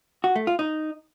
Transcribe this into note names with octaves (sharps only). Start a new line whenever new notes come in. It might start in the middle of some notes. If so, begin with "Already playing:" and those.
F#4
A3
F4
D#4